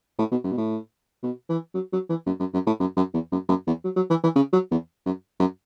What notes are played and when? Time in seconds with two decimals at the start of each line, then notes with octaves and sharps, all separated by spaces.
0.19 A2
0.31 B2
0.44 F#2
0.52 B2
0.57 A2
1.23 B2
1.49 E3
1.74 F#3
1.93 F#3
2.09 E3
2.26 F#2
2.40 F#2
2.54 F#2
2.66 A2
2.80 F#2
2.96 F#2
3.13 E2
3.32 F#2
3.49 F#2
3.67 E2
3.84 F#3
3.96 F#3
4.10 E3
4.23 E3
4.35 C#3
4.53 F#3
4.71 E2
5.06 F#2
5.40 F#2